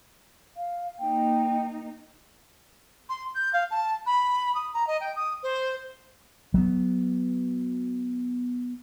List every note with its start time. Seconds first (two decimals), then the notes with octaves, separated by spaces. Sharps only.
0.56 F5
0.98 A#3 D#4 G5
3.09 C6
3.34 G6
3.53 F5
3.70 A5
4.06 B5
4.55 D#6
4.73 A#5
4.87 D#5
5.00 G5
5.15 D#6
5.43 C5
6.54 F#3 B3